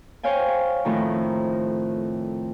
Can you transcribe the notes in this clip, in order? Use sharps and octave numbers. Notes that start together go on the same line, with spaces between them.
C5 C#5 F5 G5 G#5
F2 A2 D#3 A#5